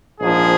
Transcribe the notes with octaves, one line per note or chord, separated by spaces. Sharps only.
A#1 G#2 F3 G#4